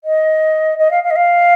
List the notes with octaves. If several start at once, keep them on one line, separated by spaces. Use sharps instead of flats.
D#5
D#5
F5
F5
D#5
F5